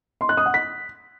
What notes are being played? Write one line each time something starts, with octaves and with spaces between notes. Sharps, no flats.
C6
F#6
D#6
F#5
B6